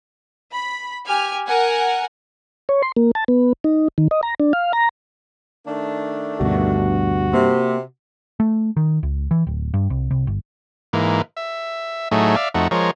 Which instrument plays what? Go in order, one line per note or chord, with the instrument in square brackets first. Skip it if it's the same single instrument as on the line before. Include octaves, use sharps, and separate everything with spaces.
[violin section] B5
G4 G#5 F6
A#4 F#5 G#5
[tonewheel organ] C#5
C6
A#3
A5
B3
D#4
D#3
D#5
A#5
D4
F5
A#5
[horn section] D#3 A3 D4
[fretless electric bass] D2 B2 [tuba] G2 [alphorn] F#4
[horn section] C3 [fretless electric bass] A#3
[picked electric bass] A3
D#3
C#2
E3
D1
G2
C2
C2
G1
[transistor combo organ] G#2 E3 A#3
E5
A2 F#3 A3 D#4 G#4
D5 E5 F5
F2 A3 D#4 F#4
F3 G#3 A#4 C#5